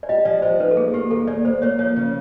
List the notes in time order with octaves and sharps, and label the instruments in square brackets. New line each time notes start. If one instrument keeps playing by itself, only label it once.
[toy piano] D5
[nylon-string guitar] G4 [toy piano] D#5
[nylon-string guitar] F3 [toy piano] D5
[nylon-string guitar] F3 [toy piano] C5
[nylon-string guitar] D#4 [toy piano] B4
[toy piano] A4
[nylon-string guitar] A#3 [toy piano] G#4
[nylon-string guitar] A#3 [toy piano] G4
[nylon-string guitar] D#2 [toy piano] A4
[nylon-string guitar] A#3 [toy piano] D5
[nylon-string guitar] A#3 [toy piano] C5
[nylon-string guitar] A#3 [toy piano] C#5
[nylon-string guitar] F3 [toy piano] C#5
[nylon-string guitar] C#3